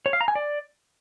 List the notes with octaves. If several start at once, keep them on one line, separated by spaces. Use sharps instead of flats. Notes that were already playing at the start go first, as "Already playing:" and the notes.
C#5
F5
A#5
G#5
D5